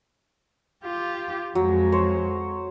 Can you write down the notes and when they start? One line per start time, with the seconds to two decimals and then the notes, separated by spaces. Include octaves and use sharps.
0.84 F4 G4
1.55 F2 F#3 G#3
1.92 C5 C#5